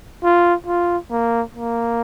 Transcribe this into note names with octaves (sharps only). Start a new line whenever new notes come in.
F4
F4
A#3
A#3